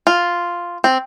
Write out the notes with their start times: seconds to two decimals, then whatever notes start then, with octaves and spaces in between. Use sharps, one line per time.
0.07 F4
0.84 C4